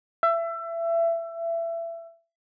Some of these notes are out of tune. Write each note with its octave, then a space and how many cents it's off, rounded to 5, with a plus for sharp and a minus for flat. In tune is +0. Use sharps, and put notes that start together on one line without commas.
E5 +25